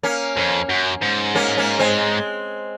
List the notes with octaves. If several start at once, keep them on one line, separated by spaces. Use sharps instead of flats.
A#3 C#4
F2
F#2
G#2
A#3 C#4
A#3 C#4
G#3 C4